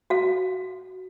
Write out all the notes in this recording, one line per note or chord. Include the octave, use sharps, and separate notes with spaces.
F#4 F5